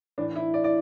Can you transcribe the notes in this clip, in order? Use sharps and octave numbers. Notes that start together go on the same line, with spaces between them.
A2 E3 D4
E4
D5
D5